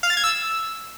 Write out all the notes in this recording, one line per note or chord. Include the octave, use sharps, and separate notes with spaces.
F5
A6
G#6
E6